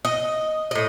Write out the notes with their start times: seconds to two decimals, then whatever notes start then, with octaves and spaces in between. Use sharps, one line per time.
0.05 D#5
0.71 A2 D#5